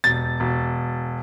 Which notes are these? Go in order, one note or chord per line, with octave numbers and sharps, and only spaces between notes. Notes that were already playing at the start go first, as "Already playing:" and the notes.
E1 A6
E1